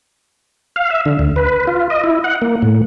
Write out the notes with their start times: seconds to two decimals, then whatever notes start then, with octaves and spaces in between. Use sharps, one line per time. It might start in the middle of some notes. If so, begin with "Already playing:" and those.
0.76 F5
0.91 E5
1.06 D3
1.19 D2
1.36 B4
1.67 F4
1.90 D#5
2.04 E4
2.24 F#5
2.42 A#3
2.62 A2